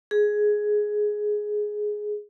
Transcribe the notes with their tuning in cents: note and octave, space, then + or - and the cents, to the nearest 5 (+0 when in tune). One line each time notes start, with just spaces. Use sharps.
G#4 +10